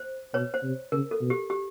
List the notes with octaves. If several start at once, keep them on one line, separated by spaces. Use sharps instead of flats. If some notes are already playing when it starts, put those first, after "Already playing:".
Already playing: C5
B2 B4 C#5
C5
C3
C#3 A#4
A4
B2
G4
G4